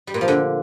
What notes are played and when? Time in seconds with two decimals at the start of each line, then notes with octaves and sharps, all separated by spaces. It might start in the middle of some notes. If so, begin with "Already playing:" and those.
0.07 G3
0.14 A#2
0.21 F3
0.28 D3